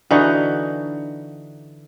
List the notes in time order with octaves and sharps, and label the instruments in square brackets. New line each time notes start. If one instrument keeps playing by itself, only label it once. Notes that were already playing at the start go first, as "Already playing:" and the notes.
[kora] D3 E3 D#4 F#4